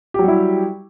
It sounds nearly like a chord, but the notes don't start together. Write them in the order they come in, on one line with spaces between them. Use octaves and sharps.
G4 F#3 G3 E4